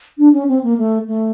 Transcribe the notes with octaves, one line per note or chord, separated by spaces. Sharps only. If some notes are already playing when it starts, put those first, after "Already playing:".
D4
C#4
C4
A#3
A3
A3